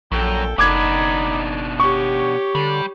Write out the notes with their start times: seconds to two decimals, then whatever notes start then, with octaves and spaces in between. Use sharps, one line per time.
0.12 A#1 F#2 A4 G5
0.58 F#1 B2 D4 D#4 B5 D6 G#6
1.80 G4 C#5 C#6
2.55 D3 G3